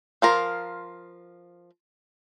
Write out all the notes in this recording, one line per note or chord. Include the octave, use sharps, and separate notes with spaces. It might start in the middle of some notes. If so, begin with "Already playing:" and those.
F3 F4 A#4